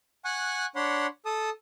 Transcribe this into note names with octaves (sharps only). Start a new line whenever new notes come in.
F#5 G#5 C#6 F#6
D4 C#5 F#5 B5 C6
A4 A5 D#6